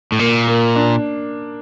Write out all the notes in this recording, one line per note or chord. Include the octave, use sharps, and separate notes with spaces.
A2
A#2 A#3
A#3
D4